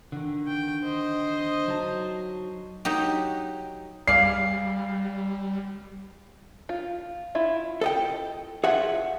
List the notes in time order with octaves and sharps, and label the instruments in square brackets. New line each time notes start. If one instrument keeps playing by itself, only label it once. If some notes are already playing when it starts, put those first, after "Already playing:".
[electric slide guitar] D3 D#3
[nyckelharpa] G5
C5 D#5
[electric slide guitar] F#3 D#4 A5
[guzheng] F#3 D#4 G4
[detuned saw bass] G3 [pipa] G#4 D5 F5 [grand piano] C7
[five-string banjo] F4
E4 F4 E5
[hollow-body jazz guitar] A4 D#5 G5
[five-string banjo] F4 E5 [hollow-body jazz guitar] G#4 F#5